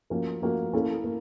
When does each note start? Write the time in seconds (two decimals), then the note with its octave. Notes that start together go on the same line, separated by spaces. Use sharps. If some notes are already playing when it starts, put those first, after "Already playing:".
0.10 F3 A#3 C#4 F#4 A#4
0.42 F3 A#3 C#4 F#4 A#4
0.73 A#3 C#4 E4 A4
1.04 A#3